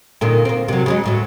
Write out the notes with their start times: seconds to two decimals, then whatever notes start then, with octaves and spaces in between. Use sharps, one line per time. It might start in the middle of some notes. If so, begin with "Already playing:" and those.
0.21 A#2 D3 D#3
0.45 A#3 C4
0.68 C3 F#3
0.86 C#3 F#3 G#3
1.04 D2 A2 F#3